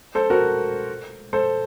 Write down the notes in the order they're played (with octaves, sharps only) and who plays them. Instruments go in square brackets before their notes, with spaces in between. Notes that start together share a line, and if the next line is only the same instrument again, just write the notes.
[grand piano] A4 C5
F#4 A#4
A4 C5